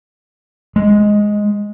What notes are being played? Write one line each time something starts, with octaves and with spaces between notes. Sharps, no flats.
G#3